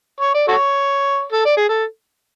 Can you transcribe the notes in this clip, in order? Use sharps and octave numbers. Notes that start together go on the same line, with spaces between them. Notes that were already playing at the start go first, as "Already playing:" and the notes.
C#5
D5
F#4 A4 C#5
A4
D5
G#4
A4